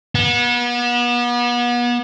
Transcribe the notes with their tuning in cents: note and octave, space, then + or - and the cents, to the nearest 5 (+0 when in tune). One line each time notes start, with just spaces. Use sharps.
B3 -35